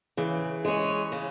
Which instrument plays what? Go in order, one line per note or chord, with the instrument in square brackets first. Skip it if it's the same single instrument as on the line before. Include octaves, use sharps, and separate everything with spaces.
[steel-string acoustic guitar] C#3 [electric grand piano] E3
[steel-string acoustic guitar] G#3 C#4
C#3